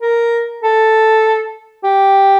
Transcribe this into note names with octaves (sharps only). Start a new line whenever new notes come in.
A#4
A4
G4